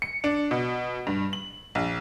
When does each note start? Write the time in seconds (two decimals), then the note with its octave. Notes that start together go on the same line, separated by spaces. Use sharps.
0.02 C#7
0.24 D4
0.51 B2
1.07 G2
1.33 F#7
1.75 A#1